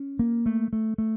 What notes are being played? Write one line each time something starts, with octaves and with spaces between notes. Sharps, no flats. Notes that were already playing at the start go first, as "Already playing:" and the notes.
Already playing: C#4
A#3
A3
A3
A3